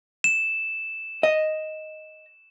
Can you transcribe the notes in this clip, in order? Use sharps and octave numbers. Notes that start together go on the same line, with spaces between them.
E7
D#5